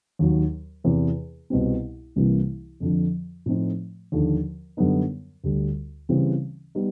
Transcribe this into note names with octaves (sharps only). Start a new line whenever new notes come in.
D#2 D#3 F#3
E2 C3 E3
C2 B2 G3 C4
C2 C3 E3 G3 A#3
F2 D3 F3
A2 F3 A3 C4 D#4
D#2 D3 F3
F#2 D3 G3 B3 D#4
D2 D3 G3
C#3 E3 G3 C4
G3 B3 D#4